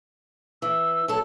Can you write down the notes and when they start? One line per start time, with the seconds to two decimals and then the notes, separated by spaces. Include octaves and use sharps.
0.62 E3 E6
1.08 F#3 A4 E6